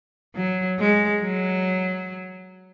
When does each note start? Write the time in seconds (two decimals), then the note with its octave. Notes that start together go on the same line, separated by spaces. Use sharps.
0.35 F#3
0.79 G#3
1.22 F#3